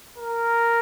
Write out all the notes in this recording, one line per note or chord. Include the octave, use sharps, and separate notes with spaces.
A#4